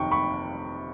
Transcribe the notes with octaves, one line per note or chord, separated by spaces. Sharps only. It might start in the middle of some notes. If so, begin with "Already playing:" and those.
Already playing: G1 F2 C3 D#3 F#3 G5 C#6
B5 C#6